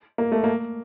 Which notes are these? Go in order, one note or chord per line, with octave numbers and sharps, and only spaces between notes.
A#3
A3
A#3